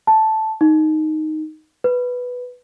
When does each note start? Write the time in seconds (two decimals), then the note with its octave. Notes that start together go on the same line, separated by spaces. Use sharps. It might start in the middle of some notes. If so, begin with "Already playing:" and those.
0.07 A5
0.61 D#4
1.84 B4